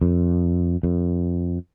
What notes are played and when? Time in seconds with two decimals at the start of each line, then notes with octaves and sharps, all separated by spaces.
0.02 F2
0.83 F2